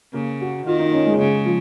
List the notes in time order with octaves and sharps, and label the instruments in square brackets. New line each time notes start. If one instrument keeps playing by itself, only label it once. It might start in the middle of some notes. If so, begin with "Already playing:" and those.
[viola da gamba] C#3 [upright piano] A#3
[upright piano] F#4
[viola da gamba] D#3 [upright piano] F4
[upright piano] D#4
C#4
G#3
[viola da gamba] C#3 [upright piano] G#3
[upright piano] F3